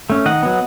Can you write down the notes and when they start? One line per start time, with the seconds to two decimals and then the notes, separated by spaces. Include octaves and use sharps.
0.10 A3 C#4
0.25 D#3 D#5 F#5
0.43 F#3 B3